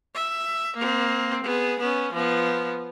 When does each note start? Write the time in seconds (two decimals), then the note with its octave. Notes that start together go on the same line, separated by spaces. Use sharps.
0.14 E5
0.77 A#3 C4
1.44 B3 G#4
1.79 B3 C#4
2.13 F3 B3